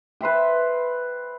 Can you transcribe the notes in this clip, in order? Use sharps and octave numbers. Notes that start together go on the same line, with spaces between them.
B4 C5 E5 G5